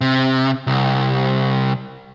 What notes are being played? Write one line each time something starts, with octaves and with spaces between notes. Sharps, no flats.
C3
C2